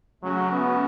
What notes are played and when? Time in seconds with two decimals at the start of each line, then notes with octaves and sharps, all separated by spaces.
0.23 C#3 F#3 A3 C#4 F#4
0.52 B3